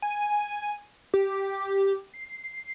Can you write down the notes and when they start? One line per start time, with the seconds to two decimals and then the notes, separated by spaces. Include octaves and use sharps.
0.02 G#5
1.14 G4
2.14 C7